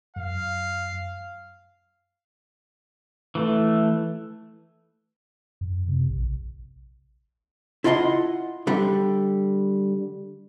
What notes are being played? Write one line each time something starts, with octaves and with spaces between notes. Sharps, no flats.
F#2 F5
E3 A3
F#2
C3
A#1
E4 F4 D#5 F#5 A5 C6
D3 G3